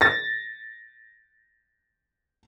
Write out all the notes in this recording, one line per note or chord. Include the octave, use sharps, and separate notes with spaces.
A6 A#6